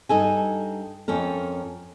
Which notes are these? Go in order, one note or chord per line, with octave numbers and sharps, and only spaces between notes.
G2 D#4 A4 G#5
F2 C#4 A4 A#4